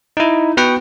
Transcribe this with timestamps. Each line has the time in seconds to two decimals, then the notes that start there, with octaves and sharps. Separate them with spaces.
0.17 D#4 E4
0.57 B3 F#4 B4 F#5 G5